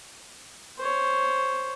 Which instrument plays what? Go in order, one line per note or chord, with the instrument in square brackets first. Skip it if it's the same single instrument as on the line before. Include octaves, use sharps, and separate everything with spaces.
[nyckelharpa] C5 C#5